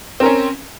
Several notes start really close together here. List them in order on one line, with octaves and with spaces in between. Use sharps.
C4 A#4 C#4